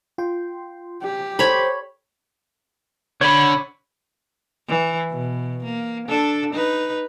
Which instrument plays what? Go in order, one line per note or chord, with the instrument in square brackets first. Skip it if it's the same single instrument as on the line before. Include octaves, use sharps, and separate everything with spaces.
[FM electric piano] F4 G5 C6
[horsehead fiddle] G4
[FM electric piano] A4 [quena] C5 [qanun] C#5 B5
[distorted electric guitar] D3 [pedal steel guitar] C#5 B5
[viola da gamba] E3
B2
A#3
D4 A4
D#4 B4